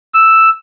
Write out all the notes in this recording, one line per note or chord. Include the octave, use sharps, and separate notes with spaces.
E6